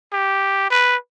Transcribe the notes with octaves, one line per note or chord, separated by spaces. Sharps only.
G4
B4